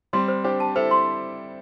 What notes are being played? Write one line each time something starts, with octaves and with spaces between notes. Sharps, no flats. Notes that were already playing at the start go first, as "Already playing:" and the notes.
G3 C4 C6
C5
D4 G4 C5
A5
E4 A4 C5
C6